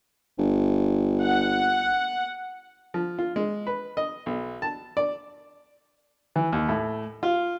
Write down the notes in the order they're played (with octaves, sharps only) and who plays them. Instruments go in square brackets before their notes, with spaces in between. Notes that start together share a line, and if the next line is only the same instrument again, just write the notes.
[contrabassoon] G1
[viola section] F#5
[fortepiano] F3
F4
G#3
B4
D#5
B1
A5
D5
E3
D#2
A2
F4